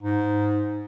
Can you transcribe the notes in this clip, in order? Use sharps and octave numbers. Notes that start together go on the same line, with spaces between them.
G#2